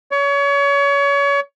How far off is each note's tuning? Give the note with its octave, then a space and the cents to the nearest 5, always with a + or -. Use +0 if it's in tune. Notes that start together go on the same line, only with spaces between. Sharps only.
C#5 +30